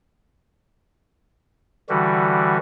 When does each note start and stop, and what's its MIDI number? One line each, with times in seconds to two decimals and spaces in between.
1.89 2.58 50
1.89 2.58 52
1.89 2.58 55
1.89 2.58 66